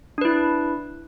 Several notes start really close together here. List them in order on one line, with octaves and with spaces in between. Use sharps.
D4 B4 E4